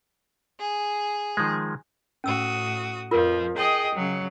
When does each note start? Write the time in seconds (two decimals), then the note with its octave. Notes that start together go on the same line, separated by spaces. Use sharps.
0.59 G#4
1.37 D#3 F3 G#3
2.24 A2 C#4 F#4 D#6 E6
3.11 F2 F3 F4 A#4 B4
3.55 G#4 D#5 G5
3.95 C#3 F#3